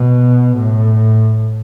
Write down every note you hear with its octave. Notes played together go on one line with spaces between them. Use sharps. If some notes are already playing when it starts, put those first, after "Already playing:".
Already playing: B2
A2